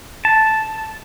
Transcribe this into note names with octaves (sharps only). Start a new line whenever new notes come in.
A5